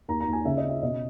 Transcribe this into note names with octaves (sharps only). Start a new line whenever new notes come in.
D#2 A#5
A#5
D#2
G#5
C#3 E5
D#5
C#4
E5
B2 D#5